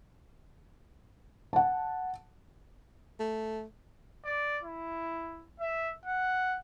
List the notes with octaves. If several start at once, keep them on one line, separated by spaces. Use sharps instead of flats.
F#5 A5
A3
D5
E4
E5
F#5